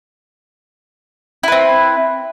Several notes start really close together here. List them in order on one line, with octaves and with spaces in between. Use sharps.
E4 B4 C4